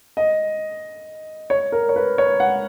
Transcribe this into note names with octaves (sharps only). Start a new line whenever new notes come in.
D#5
C#5
A#4
C#5
B4
C#5
F#5